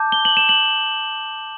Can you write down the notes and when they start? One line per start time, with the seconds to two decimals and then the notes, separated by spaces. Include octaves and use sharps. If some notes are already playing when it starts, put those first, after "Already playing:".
Already playing: A5 D6 G6
0.12 G7
0.25 F#7
0.37 E7
0.49 F#7